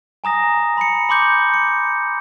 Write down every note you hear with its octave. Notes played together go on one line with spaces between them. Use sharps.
G#5 A#5 D#6 A#6
B5 C#7
B5 C6 D6 G6 C#7
C#7